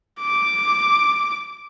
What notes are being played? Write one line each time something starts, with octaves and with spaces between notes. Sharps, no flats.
D6